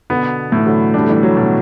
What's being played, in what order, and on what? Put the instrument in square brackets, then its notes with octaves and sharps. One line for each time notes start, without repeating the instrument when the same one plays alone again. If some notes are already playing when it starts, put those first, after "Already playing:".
[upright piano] B2 D3 [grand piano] B3
[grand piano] A2 [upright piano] E3
[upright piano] D3 F#3
[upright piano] G3 [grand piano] D4
[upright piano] A3
E3 G3
F#3 A3
[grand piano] B2